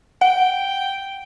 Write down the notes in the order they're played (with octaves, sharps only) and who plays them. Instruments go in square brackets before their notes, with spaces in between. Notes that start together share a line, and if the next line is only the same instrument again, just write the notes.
[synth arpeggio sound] F#5 [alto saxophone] G5